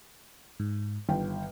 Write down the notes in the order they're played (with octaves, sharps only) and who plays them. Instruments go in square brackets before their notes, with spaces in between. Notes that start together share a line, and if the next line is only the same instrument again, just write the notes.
[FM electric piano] G#2
[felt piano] G1 G5 [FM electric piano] D#3